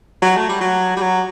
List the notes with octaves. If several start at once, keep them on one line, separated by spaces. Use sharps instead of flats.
F#3
A3
G3
F#3
G3
F#3